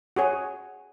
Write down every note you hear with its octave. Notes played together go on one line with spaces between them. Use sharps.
F#4 G#4 C#5